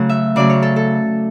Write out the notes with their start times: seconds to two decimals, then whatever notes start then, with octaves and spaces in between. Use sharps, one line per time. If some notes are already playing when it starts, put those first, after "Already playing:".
Already playing: C#3 F#3 A3 F#5
0.09 E5
0.36 C#3 F#3 A3 D5
0.50 C#5
0.62 A4
0.76 A4